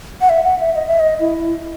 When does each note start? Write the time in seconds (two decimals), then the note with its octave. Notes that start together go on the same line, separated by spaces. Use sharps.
0.21 F#5
0.29 E5
0.45 F#5
0.60 E5
0.75 D#5
0.87 E5
1.00 D#5
1.20 E4